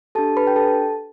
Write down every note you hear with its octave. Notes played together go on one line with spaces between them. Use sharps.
D4 G4 A4 A5
B4 B5
G5
A4 A5